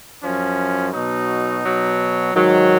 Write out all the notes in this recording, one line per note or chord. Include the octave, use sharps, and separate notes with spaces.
F#2 F3 C#4
B2 F#3 D#4
B2 F#3
G#2 D#3 F#3